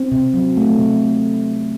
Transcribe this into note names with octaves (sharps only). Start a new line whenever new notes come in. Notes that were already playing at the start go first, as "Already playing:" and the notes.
Already playing: C4
C3
F#3
A3
C3